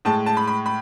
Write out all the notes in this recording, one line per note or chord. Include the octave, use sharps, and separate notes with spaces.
A2 G#3 A5
A5
B5
B5
B5